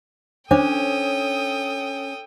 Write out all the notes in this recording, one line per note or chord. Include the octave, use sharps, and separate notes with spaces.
C#4 D4 A4 C5 G5 D6 D#6